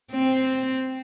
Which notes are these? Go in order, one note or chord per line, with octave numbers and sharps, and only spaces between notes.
C4